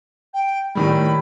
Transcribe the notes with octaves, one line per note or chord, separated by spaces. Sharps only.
G5
A2 D#3 G3 B5